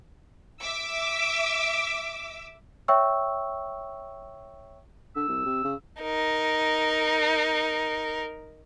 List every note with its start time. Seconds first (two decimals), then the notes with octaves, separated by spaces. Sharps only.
0.61 E5 D6 E6
2.88 C#5 E5 G5 C#6 E6
5.16 D3 E6
5.28 C2
5.45 C3
5.64 C#3
6.01 D#4 A#4